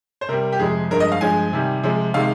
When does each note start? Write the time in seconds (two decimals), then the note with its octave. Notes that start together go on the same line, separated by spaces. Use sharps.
0.21 C5
0.29 C3 G3 A#4
0.52 G4
0.59 F2 C3 F3 G#3 G#4
0.91 G2 F3 G#3 A#4
1.00 D#5
1.12 F5
1.21 G2 F3 G#3 G#5
1.53 C3 D#3 G3
1.83 C3 F3 G#3
2.14 C3 D#3 G#3 F5